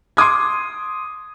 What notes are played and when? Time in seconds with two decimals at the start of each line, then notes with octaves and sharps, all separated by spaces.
0.17 C6 D6 D#6 G#6